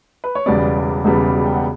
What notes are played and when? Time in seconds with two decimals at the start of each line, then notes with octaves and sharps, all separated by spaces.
0.24 B4
0.35 C#5
0.46 E1 E2 C#3 G3 B3 D5
1.05 E1 E2 C#3 G3 B3
1.46 G5
1.54 F#5